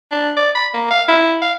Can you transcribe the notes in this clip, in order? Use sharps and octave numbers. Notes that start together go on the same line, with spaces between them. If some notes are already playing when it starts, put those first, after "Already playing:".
D4
D5
B5
A#3
F5
E4
F5